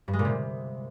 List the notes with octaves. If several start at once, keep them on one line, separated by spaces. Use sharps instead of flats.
G2
G#3
A#2
C3